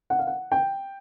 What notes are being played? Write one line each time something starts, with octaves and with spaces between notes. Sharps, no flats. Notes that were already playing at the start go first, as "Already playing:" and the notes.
F#5
F5
F#5
G5